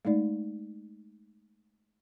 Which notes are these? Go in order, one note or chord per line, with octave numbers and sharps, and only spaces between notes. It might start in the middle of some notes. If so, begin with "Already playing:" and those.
G#3 A3 D#4 D5